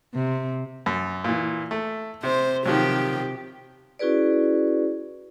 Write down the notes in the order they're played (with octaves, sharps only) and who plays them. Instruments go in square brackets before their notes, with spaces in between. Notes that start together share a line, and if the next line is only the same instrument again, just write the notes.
[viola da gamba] C3
[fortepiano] F#2
A#2 E3
A3
[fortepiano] C3 [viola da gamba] C5
[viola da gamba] C3 G4 [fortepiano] D#3 F3 F#3
[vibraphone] C#4 E4 F#4 G#4 B4 D5